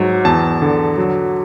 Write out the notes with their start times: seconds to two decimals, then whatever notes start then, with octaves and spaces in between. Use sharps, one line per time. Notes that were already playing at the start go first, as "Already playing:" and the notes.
Already playing: G#2 F#3
0.25 E2 A5
0.62 D3
0.98 F#3